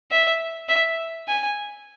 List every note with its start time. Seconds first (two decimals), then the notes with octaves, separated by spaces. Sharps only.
0.11 E5
0.69 E5
1.28 G#5